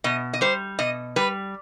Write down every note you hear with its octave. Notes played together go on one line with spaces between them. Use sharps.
B2 D#5
D#5
G3 C5
B2 D#5
G3 B4